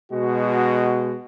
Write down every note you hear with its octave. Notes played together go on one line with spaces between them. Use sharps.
B2 G#3 F#4